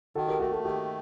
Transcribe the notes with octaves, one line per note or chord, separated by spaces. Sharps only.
D#3 F#4 A4
G4 A#4
A3 F#4 A4
F#4 A4
D#3 G4